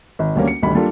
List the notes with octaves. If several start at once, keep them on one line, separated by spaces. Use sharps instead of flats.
G#1
D2 G3 A#3 C#4
C#7
G#1 D2 G3 B5
G3 A#3 D4 F4 A4